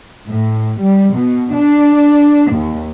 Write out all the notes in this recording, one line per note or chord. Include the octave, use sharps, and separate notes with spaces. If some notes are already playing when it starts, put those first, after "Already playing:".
A2
G3
B2
D4
D#2